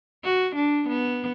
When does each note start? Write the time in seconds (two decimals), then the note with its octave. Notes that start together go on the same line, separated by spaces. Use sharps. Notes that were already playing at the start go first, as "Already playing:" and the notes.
0.24 F#4
0.55 D4
0.88 B3